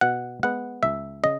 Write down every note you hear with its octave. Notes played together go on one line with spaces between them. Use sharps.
B2 F#5
G#3 B3 F#5
C#2 E5
C#3 D#5